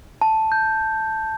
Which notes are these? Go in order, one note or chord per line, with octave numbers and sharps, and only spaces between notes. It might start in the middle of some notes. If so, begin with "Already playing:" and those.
A5
G6